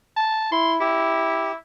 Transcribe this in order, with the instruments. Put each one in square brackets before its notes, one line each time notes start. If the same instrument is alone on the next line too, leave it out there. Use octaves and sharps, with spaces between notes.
[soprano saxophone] A5
[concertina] E4 [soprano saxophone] C6
[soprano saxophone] E4 [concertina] G4